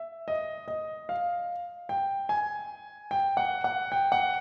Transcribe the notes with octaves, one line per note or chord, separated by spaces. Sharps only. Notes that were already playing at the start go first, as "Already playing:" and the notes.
Already playing: E5
D#5
D#5
F5
G5
G#5
G5
F#5
F#5
G5
F#5